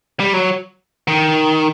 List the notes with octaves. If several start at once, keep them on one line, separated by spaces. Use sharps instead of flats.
G3
F#3
D#3